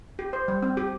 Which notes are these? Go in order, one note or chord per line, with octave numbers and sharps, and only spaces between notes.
G4
C5
G3
C4
G4